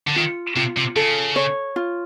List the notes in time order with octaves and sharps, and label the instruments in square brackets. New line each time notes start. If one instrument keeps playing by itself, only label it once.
[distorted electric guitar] D3
[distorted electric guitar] D#3 [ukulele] F4
[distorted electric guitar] C3 [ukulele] F4
[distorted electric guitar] C3
[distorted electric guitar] C#3 [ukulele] A4
[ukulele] C#5
F4